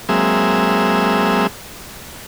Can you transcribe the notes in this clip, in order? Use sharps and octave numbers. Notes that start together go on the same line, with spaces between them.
F#3 G#3 A#3 C4 G#4 E5